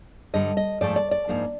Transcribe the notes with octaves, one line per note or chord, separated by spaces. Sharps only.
G2 D3 G3 D#5
D#5
G#2 F3 A3 D5
D5
D5
G#2 F3 A#3 D4